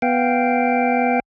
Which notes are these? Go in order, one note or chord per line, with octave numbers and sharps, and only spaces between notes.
B3 F5 G5